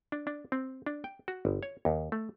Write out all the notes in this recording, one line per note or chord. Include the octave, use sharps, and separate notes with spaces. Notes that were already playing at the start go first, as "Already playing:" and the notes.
D4
D4
C4
D4
G5
F#4
G1
C#5
D#2
A3